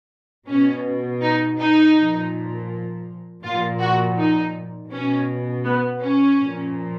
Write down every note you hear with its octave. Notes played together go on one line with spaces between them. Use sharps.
B2 C#4
D#4
D#4
A#2 F3
A#2 F3 F4
F#4
D#4
B2 C#4
B3
C#4
A#2 F3